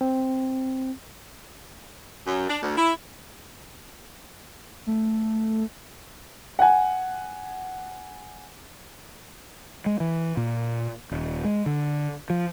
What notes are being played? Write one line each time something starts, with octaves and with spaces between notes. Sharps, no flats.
C4
F#2
D4
D2
E4
A3
F#5 G#5
G#3
E3
A#2
D#1
G#3
D3
F3